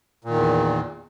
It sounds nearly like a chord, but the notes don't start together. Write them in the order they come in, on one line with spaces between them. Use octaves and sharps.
A#2 D#3 E2